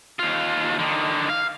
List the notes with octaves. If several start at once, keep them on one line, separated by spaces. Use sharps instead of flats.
D#2 F4
D3 D#3
F5